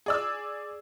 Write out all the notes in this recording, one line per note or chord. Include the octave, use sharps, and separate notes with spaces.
G#4 D5 E6